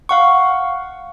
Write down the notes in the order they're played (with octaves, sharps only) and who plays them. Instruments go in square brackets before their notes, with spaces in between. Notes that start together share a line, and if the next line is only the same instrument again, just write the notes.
[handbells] F5 F#5 C#6